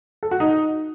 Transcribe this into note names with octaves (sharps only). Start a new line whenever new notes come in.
A4
F#4
D#4